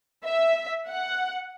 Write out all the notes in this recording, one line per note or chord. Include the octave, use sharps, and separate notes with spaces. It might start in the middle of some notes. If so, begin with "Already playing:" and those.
E5
F#5